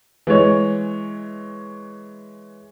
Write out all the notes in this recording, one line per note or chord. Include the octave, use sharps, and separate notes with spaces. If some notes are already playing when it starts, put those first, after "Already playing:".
E3 G#3 C#5